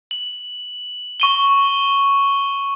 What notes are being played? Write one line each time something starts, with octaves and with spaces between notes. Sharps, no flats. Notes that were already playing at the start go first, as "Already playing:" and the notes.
F#7
C#6 D#7 G7